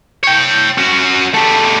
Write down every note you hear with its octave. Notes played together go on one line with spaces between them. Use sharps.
C#5 G5
C#4 F#4
G3 A3